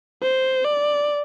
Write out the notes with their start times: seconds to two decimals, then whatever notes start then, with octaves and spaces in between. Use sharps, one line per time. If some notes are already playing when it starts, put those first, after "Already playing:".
0.22 C5
0.64 D5